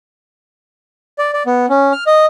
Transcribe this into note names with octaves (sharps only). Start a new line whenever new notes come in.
D5
D5
B3
C#4
F6
D#5